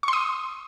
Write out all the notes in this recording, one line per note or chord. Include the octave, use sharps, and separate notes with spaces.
C6 C#6 D#6